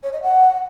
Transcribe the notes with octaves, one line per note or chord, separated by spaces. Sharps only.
C#5
D#5
F#5